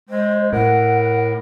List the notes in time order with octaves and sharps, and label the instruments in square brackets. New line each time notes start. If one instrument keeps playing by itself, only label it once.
[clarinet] G#3 [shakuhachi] C5
[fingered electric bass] A2 [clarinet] A#4 [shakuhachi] F#5